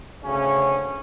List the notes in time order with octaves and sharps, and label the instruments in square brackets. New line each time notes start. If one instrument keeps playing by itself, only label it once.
[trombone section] D2 C#3 C#4